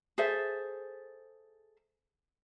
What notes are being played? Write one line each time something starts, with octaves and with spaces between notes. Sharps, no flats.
G#4 A4 C5 E5